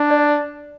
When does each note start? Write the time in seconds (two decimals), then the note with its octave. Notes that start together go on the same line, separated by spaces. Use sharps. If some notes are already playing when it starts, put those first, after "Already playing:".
Already playing: D4
0.10 D5